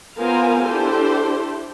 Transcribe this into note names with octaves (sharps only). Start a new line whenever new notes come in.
B3 F4 A#4 C5 F5 G#5
D4 E4 G4 A4 C5